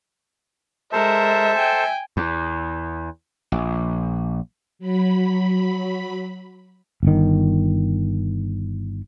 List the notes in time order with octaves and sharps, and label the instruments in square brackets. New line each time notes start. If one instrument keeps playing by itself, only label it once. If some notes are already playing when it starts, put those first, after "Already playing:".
[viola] G#3 A#4 [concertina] A4 C5 A5 [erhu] E5
[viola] G5 G#5
[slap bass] E2
A#1
[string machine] F#3 B5
[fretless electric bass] G1 D#3